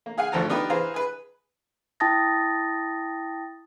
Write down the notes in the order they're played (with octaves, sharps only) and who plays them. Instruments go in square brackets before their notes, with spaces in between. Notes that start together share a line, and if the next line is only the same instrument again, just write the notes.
[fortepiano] A#3
G#4 F5 F#5 G#5
G#1 D2 F3 A4 A5 A#5
B3 D4 D#4 F4 G4 B4
E3 G#4 B4 C5 F5 A#5
G#4 B4
[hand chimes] E4 G5 A5 D#6 A6 A#6